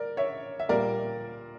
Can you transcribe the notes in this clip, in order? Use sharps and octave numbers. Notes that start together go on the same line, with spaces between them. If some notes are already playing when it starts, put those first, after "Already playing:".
Already playing: A#4 D5
C#5 E5
E5
A#2 G3 A#3 A#4 D5